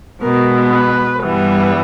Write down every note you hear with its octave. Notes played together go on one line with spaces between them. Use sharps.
B2 G#3 B3 A#4
B4
G2 E3 G3 B3